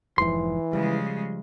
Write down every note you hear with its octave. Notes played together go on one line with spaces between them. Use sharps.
F1 G#2 E3 F3 C6
C#3 F3 G3 G#3